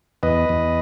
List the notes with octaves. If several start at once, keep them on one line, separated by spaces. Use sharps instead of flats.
E2 B4 D#5
E2